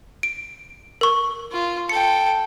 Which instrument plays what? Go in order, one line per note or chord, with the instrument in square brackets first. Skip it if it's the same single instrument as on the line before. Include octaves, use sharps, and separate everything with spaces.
[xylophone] D7
A#4 C#6
[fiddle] F4
[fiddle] A4 G5 [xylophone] C#7